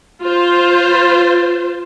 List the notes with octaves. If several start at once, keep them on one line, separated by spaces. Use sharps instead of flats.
F4 C5